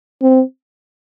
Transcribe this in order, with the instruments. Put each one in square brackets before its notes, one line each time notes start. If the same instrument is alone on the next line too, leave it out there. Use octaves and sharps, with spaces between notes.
[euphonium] C4